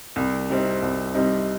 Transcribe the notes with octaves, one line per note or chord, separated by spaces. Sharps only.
C2
C3 G3 C4 D#4
C2
C3 G3 C4 D#4